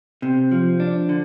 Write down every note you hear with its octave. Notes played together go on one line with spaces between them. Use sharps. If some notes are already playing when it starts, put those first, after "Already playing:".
C3
F3
D4
D3